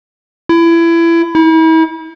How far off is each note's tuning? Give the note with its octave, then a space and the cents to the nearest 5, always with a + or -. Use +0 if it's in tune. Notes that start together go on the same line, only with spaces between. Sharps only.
E4 +25
E4 -40